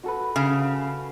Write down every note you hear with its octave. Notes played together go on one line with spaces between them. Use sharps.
F#4 A4 B4
C#3